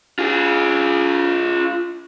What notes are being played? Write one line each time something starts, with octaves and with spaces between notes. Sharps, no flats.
F4 G#4